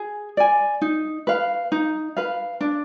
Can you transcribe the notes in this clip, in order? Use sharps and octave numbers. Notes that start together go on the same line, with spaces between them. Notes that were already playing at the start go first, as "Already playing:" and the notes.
Already playing: G#4
D5 G#5
D#4
B4 F5
D#4
B4 F5
D4